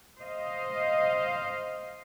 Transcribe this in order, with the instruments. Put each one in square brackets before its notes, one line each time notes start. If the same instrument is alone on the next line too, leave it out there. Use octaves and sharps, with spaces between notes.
[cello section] C5 D#5 F5